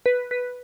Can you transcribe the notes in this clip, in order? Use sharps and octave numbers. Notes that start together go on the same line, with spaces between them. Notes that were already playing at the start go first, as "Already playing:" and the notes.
B4
B4